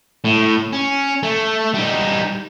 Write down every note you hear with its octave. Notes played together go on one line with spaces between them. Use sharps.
A2
C#4
A3
G3 D#4